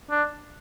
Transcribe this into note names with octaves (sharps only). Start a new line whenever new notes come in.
D4